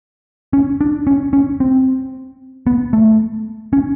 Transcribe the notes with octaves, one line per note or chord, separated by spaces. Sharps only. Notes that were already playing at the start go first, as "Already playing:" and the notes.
C#4
D4
C#4
C#4
C4
B3
A3
C#4